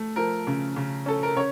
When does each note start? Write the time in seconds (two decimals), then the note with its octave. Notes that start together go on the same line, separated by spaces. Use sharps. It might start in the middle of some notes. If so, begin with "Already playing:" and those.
Already playing: A3
0.16 F3 A#4
0.47 C#3
0.76 C#3
1.06 C#4 A4
1.23 A#4
1.36 C#3 C#5